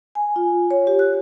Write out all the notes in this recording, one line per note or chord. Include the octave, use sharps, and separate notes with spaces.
G#5
F4
C#5
G4
F#6